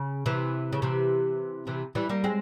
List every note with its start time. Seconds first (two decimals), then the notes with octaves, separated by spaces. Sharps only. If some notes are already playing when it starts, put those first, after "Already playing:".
Already playing: C#3
0.26 C3 E3
0.72 C#3
0.82 C3 E3
1.67 C3 E3
1.95 E3 G3
2.09 G3 A#3
2.24 G#3 C4